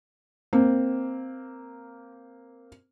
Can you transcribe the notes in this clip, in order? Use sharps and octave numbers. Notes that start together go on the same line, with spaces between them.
A#3 C4